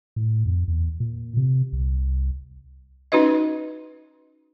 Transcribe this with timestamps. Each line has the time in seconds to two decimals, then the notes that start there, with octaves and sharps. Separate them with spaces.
0.16 A2
0.46 F2
0.68 E2
1.00 A#2
1.37 C3
1.73 C2
3.12 C#4 D#4 F#4 B4 D#5